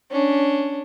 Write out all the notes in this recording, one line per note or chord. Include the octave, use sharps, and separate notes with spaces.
C#4 D4